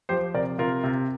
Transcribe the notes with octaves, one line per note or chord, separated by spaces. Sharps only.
F3 G4 C5
C3 A#4 D5
C3 F4 A#4
C3